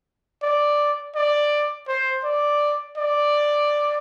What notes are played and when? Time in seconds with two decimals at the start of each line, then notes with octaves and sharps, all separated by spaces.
0.42 D5
1.15 D5
1.88 C5
2.24 D5
2.97 D5